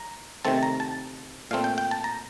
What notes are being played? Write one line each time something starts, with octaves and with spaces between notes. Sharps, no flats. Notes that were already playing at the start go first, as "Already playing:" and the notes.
Already playing: A#5
C3 D#3 A3 C4 A5
A#5
A5
A#2 A3 C4 F5
G5
G5
A5
A#5